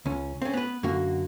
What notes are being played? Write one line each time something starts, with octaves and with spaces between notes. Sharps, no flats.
C#2 C#4
C4 C#4
B3 B4
F#2 D3 A#3 F#4